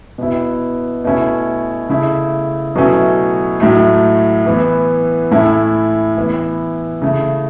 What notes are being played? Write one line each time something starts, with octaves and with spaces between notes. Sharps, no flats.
B2 B3 E4
B2 A3 C#4 E4
C#3 A3 E4
B2 F#3 A3 C#4 E4
A2 F#3 A3
E3 B3 E4
A2 A3 C#4 E4
E3 B3 E4
C#3 A3 E4